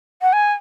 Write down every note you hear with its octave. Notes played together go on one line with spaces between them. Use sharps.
F#5
G#5